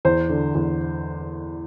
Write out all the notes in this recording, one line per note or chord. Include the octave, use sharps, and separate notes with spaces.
E2 C5
D3
E2